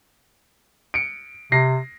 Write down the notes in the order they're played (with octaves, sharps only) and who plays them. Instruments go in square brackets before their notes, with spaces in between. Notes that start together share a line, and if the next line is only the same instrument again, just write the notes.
[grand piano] C#7 D7
[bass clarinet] C3 [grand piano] A#6 C7